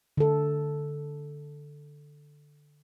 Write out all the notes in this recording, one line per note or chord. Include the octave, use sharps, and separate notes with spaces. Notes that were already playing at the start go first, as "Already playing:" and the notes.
D3 A4